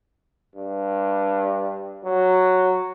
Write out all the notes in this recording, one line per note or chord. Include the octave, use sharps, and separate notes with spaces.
G2
F#3